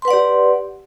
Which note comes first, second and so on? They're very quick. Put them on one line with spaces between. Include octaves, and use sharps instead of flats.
C6 B4 F#5 D5 G4